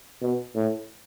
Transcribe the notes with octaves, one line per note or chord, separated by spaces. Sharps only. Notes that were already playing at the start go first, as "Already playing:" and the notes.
B2
A2